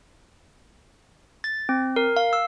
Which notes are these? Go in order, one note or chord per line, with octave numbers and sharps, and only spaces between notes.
A6
C4
A#4
F5
E6